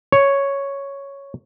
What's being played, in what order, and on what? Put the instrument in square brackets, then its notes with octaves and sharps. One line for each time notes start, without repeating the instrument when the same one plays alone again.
[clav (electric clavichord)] C#5